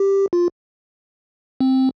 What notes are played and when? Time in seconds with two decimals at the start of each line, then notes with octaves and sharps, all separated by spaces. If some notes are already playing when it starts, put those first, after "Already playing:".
Already playing: G4
0.33 F4
1.60 C4